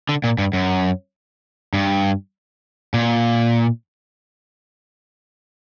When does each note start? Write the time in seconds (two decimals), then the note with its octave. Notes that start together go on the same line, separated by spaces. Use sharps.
0.09 D3
0.24 A#2
0.38 G2
0.53 F#2
1.74 G2
2.94 A#2